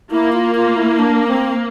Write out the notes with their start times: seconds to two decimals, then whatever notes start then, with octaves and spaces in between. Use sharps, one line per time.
0.11 A#3 E4
0.33 F4
0.55 F4
0.77 E4
0.99 D4
1.28 C4